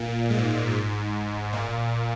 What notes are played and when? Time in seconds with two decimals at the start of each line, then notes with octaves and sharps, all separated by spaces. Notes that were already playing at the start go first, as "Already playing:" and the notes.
Already playing: A#2
0.30 G#2
0.71 G#2
1.53 A#2